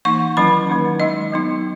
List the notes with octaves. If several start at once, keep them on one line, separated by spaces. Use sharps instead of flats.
E3 A#3 D#4 C#6
D#3 F#3 C#4 E4 B5
D#3 A#3 D#4
G#3 D#4 D#5
F#3 B3 D#4